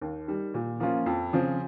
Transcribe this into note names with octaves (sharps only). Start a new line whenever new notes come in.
D#2
D#3 G3
A#2
F3 A#3 C#4 F4
F2
C#3 F3 C4